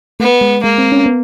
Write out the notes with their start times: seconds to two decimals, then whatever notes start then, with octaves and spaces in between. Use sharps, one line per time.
0.20 A3 B3
0.41 G#3
0.63 G#3 A#3
0.78 C4
0.92 C#4
1.06 B3